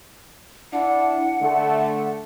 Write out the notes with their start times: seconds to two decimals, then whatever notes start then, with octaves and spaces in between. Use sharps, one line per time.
0.73 D4 E4 F#5
1.41 D3 A3